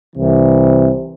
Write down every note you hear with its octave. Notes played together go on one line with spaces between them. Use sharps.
C2 C3 E3